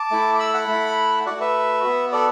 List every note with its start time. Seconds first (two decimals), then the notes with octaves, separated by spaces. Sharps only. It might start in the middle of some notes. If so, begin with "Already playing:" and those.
Already playing: A5 D6
0.11 A3 E4
0.35 D6
0.39 B5 E6
0.54 F#5 B5
0.68 A3 E4
1.26 A3 F#4 D5 F#5
1.41 B4 E5
1.84 B3 F#4
2.12 A4 D5